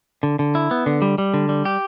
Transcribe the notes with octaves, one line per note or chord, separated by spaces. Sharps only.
D3
D3
E4
B3
D3
G3
G3
D3
G3
G4